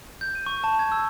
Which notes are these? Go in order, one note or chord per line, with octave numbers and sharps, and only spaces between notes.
G6
D#7
C#6
A5
G#6
E6